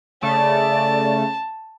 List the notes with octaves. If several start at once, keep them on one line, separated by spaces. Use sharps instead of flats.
C#3 A3 D5 A5